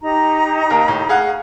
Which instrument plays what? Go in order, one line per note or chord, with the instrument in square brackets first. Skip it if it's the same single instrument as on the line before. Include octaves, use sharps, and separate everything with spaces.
[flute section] D#4 G4 A#5
[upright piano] D#2 A#4
A2
G#4 F5 F#5